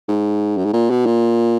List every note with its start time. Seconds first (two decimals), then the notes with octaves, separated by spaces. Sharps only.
0.09 G#2
0.57 F#2
0.65 G#2
0.73 A#2
0.90 B2
1.06 A#2